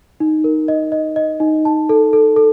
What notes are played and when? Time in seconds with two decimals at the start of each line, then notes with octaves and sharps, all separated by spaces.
0.20 D#4
0.44 A#4
0.68 D#5
0.92 D#5
1.16 D#5
1.40 D#4
1.65 A5
1.89 A4
2.13 A4
2.37 A4